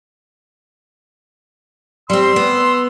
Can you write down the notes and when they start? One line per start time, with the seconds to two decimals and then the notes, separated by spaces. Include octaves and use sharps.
2.10 G3 C4 C6 E6
2.36 B3